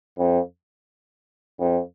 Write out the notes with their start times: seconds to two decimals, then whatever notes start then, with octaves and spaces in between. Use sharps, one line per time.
0.18 F2
1.59 F2